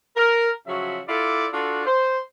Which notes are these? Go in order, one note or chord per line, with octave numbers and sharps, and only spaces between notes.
A#4
C#3 F3 F#3 F#4 E5
E4 F4 G4 A4 D5
D4 F4 F#4 A4
C5